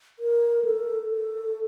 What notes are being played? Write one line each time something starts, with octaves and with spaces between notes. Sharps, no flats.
A#4
A4
A4